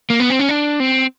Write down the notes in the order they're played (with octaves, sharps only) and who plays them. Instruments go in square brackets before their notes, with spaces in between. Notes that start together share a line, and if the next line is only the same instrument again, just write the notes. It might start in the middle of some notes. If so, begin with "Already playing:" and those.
[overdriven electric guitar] A#3
B3
C4
C#4
D4
C4